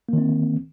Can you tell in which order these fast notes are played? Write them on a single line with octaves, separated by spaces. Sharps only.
A#3 D#3 C4